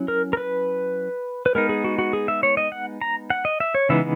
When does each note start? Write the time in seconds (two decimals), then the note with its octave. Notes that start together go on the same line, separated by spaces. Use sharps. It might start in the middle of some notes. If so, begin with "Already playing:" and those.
Already playing: F#3 C#4 E4
0.08 A#4
0.33 A#4
0.37 B4
1.46 B4
1.55 G#3 B3 D#4 A#4
1.69 G#4
1.84 F#4
1.99 F#4
2.13 G#4
2.28 E5
2.43 C#5
2.57 D#5
2.72 F#5
3.01 A#5
3.30 F#5
3.45 D#5
3.60 E5
3.75 C#5
3.89 C#3 E3 G#3 B3 D#4 E5